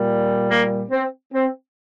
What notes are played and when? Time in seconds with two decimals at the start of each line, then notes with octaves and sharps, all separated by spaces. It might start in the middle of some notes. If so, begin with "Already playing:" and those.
Already playing: A#2 G3
0.49 A#3
0.90 C4
1.33 C4